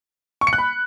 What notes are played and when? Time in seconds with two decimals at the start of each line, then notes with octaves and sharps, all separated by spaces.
0.41 C#6
0.47 C#7
0.53 F#6
0.58 B5